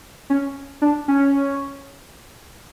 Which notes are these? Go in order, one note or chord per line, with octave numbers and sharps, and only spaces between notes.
C#4
D4
C#4